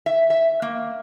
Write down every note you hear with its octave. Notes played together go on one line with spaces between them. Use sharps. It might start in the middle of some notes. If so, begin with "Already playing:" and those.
E5
E5
A#3